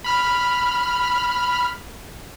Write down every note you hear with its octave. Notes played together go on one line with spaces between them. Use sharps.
B5 F6